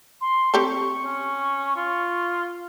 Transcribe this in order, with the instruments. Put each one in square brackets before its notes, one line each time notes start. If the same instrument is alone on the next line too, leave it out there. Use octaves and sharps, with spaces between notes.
[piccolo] C6
[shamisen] C4 G4 A4 [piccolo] C#6
[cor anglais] C#4
F4